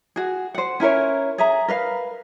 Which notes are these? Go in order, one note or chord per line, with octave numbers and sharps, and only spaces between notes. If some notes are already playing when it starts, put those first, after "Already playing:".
F#4 G#4
C5 F#5
C#4 E4 A#4 C#5
G#4 E5 A#5
A#4 B4 F5